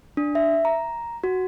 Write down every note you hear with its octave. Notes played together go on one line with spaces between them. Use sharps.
D4
E5
A#5
F#4